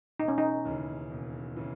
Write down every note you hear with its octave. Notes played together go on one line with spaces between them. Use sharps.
E1 D#4
C#4
D#4
D#2 C#3 E3
E1
C#3 E3